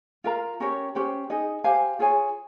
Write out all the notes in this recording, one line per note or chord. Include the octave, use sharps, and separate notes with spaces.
F4 A#4 F5 A#5
C#4 G4 A#4 C#5
C#4 G4 C5
D#4 G#4 D#5
G4 C5 F5 G#5
F4 G#4 C#5 G#5